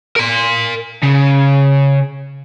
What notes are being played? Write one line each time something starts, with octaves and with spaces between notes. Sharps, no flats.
A#4 C6
C#3